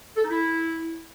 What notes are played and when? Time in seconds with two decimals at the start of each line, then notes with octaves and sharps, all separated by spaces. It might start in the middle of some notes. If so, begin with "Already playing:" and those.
0.16 A4
0.23 D#4
0.30 E4